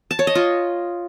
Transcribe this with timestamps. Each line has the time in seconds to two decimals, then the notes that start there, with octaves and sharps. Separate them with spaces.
0.11 A5
0.19 C#5
0.27 D#5
0.35 F4